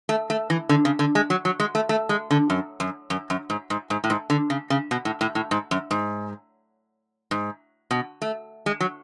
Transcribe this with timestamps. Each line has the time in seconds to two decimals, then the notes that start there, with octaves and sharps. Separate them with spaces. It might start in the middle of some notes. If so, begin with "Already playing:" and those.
0.09 A3
0.30 A3
0.50 E3
0.69 D3
0.85 C#3
0.99 D3
1.15 G#3
1.30 F#3
1.45 F#3
1.60 G#3
1.75 A3
1.89 A3
2.09 G#3
2.31 D3
2.50 F#2
2.80 F#2
3.10 F#2
3.30 F#2
3.50 G#2
3.70 G#2
3.90 G#2
4.04 A2
4.10 G#2
4.30 D3
4.50 C#3
4.70 C#3
4.91 B2
5.05 A2
5.21 A2
5.35 A2
5.51 G#2
5.71 F#2
5.91 G#2
7.31 G#2
7.91 B2
8.22 A3
8.66 G#3
8.80 F#3